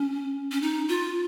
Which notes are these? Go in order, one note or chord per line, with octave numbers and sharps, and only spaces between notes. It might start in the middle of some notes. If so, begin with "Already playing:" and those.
Already playing: C#4
C#4
D#4
F4